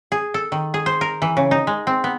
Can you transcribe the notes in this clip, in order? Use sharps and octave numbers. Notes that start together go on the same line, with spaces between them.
G#4
A4
D#3
G#4
C5
A#4
E3
C#3
D#4
G#3
C4
B3